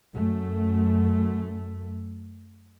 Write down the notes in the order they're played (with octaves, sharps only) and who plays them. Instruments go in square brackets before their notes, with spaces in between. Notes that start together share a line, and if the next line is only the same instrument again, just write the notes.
[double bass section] F#2 A3